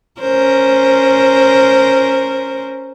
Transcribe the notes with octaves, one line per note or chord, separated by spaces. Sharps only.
C#4 A#4 C5